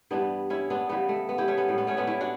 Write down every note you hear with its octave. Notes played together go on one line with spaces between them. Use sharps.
G2 E3 G3 B3 D4
C#4 E4
B3 D4
C#3 E3 G3 B3
A3
B3
E4 G4
A3 C#4
B3
A2 G3
B3
A3 C#4
B3 D4
C#4 E4
D4 F#4